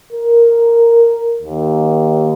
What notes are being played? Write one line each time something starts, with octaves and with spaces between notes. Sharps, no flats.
A#4
D#2